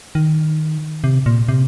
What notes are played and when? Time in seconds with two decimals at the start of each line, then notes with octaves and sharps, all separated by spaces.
0.15 D#3
1.04 C3
1.26 A#2
1.49 C3